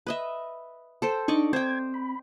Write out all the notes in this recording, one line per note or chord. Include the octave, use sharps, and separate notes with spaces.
B4 D#5 E5
A4 C5 G5
D4 D#4 D5 D#5 C#6
C4 C5 G5 G#6
B5